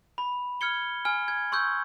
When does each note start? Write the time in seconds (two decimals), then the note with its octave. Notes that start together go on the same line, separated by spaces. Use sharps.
0.18 B5
0.61 F6 G#6 C#7 G7
1.05 G#5 F6
1.28 G#6
1.52 C6 C#6 E6 G6